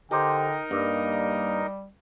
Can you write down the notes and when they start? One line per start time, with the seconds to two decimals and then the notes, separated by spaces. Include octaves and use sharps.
0.11 D3 D#4 G4 A#4 C5 D#5 G5
0.71 G2 G3 A#3